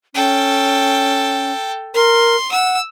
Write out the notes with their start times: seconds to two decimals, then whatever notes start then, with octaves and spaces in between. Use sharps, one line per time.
0.15 C#4 A4 G5
1.94 A#4 C6
2.52 F#5 E6